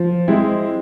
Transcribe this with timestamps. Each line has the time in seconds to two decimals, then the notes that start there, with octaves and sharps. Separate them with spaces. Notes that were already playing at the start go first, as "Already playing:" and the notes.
Already playing: F3
0.28 G#3 C4 E4